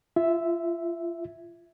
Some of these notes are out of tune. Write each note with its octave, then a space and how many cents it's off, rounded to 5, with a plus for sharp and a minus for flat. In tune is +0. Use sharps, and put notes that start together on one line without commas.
F4 -30 E5 +0